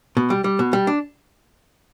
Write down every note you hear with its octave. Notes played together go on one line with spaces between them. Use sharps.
B2
G3
G3
B2
G3
D4